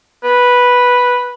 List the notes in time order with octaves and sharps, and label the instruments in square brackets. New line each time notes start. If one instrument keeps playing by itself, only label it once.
[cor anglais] B4